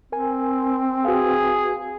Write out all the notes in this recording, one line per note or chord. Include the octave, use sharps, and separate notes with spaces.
C4 A#4 G#5
F#4 G#4 B4 F5